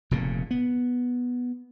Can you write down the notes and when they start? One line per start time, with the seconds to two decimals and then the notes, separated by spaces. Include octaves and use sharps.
0.11 F1 A#2 C#3
0.51 B3